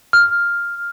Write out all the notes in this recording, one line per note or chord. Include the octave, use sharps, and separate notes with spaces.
F6